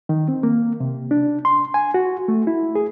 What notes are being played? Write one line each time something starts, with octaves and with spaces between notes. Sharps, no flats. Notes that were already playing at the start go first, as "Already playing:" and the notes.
D#3
C4
A#3
C3
D4
C6
G#5
F#4
A3
E4
G#4